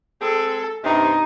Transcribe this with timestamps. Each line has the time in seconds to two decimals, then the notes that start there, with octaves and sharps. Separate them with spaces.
0.21 G#3 C4 G#4 A4
0.84 G2 C3 D#4